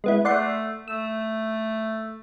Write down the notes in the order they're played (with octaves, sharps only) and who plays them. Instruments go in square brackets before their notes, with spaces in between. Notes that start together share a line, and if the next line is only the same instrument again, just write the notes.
[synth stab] G#3 B3 E4
[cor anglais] A3 [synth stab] D5 F#5 C6
[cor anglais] A3 [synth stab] E6